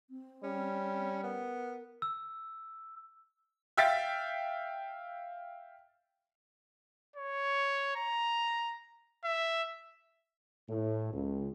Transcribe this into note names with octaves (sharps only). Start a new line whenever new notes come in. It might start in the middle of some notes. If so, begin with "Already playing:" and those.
C4
G3 C#4
B3 A#4
E6
E5 F5 G5 A6 B6
C#5
A#5
E5
A2
C#2